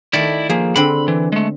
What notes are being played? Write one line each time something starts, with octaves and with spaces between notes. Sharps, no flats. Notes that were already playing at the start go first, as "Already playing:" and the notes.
D#3 A3 E4 D5
F3 A#3 G#4
D3 C4 B5
E3
G#3 A3